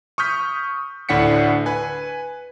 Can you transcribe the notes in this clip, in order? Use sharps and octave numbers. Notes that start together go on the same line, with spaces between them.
C#6 D#6 F6 G6 B6
D2 A2 D4 F#5 B6 C#7
B4 G#5